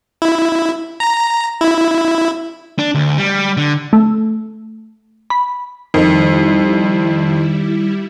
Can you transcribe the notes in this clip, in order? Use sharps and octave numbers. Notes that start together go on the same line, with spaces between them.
E4
A#5
E4
D4
D2
G3
D3
A3
B5
F2 D#3 G3 E4